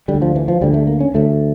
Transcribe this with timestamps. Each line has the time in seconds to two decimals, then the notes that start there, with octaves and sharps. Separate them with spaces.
0.08 D3 G3
0.14 D2
0.22 F3
0.36 E3
0.48 F3
0.61 D2 D3 G3
0.74 A3
0.87 A#3
1.00 C#4
1.14 D2 D3 A3